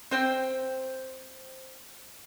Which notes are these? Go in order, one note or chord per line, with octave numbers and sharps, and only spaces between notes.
C4 C5 G5